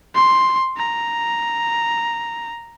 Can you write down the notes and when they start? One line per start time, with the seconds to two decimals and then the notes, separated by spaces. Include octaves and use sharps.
0.15 C6
0.77 A#5